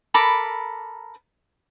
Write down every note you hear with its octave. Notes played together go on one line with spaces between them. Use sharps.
A4 A#4 B5 D6